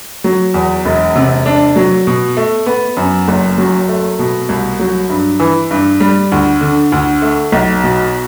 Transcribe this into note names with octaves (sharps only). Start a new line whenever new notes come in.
F#3
E2
E1
C3
D4
F#3
B2
A3
B3
F#2
F#1
F#3
A3
B2
C2
F#3
G2
E3
G2
G3
D2
D3
D2
A3
B1
B2